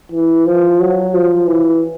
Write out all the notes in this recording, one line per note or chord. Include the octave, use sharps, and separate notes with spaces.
E3
F3
F#3
F3
E3